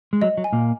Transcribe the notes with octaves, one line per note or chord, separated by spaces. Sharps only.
G#3
F#3 D#5
F#3
G#5
A#2 A#3